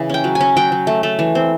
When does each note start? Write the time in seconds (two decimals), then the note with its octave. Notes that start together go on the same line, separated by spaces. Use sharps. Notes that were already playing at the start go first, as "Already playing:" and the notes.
Already playing: C#3 E3
0.10 C#4 G5
0.24 F#3
0.35 G#5
0.41 C#4
0.57 F#3 G5
0.72 F#3
0.87 A3
1.03 A3
1.19 E3
1.35 C4